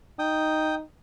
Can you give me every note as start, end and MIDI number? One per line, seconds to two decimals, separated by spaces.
0.19 0.84 63
0.19 0.75 79
0.19 0.75 87